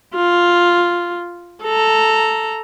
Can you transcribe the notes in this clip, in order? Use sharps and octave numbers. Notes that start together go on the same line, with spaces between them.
F4
A4 A#5